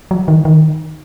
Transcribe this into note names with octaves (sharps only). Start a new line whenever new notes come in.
F#3
D#3
D#3